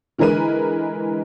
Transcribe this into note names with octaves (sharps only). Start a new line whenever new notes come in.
D3 E3 G#3 A#4 B4 D#7